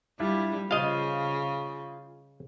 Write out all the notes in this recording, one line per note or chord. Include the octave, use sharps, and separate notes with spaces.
G3 D4 E4 F4
C#3 F4 G#4 C5 D#5 F5